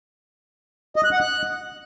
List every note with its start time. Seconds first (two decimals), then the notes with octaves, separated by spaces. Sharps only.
0.96 D#5
1.04 F#6
1.12 F#5
1.21 F#6